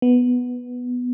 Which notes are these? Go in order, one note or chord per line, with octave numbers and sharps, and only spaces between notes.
B3